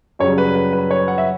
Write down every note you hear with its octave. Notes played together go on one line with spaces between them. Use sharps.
F#2 C#3 G3 C#5
B4
B4
B4
C#5
F#5
E5